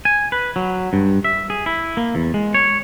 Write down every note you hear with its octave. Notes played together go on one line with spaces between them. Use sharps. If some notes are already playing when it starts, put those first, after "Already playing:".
G#5
B4
F#3
G2
E5
G#4
E4
A#3
E2
G#3
C#5